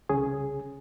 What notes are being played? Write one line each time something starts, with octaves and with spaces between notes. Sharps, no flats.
C2 C#3 C#4 G#4